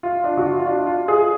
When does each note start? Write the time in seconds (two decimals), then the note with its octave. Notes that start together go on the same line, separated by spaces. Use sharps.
0.03 F4
0.24 D4
0.37 F#4
0.45 F4
0.59 F4
0.66 D4
0.87 F4
1.08 G#4